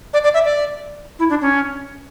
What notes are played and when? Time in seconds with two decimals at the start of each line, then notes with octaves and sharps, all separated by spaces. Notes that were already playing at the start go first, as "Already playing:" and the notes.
0.13 D5
0.24 D5
0.34 E5
0.45 D5
1.19 E4
1.30 D4
1.41 C#4